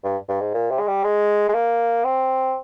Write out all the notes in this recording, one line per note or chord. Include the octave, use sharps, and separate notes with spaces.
G2
G2
G#2
A#2
C3
G#3
G3
G#3
G#3
A#3
C4